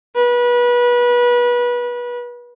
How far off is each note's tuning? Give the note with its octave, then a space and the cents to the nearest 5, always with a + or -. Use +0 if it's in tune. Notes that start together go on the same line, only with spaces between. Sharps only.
B4 -30